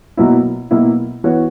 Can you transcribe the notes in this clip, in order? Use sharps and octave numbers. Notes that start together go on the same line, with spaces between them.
B2 F#3 A#3 E4
B2 F#3 A#3 E4
E3 B3 F#4 C#5